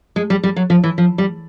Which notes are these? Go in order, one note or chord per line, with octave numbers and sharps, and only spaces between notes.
G#3
G3
G3
F#3
F3
E3
F3
G3